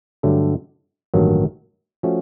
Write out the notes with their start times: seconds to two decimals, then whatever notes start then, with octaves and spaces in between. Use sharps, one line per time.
0.23 G2 D3 F#3 A3
1.14 A1 G2 D#3 F#3 A#3
2.03 F3 A3 C#4 F#4